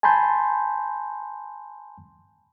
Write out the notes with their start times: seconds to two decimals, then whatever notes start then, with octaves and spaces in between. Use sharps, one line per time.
0.03 G#5 A5 B5 C6 G6